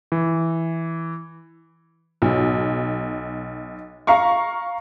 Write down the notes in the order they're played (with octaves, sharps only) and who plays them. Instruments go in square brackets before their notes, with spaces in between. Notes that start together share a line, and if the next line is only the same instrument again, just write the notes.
[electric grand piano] E3
[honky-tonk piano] B1
F5 A#5 C#6